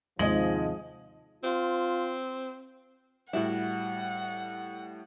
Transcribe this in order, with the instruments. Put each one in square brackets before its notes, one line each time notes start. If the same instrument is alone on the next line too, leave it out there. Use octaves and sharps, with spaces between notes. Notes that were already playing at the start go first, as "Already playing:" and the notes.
[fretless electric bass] D#2 C3 [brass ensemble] G#2 F3 [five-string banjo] G#3 [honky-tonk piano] D#5 F#7
[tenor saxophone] C4 [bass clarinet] F4
[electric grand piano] A2 G3 [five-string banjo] E4 F#4 [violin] F#5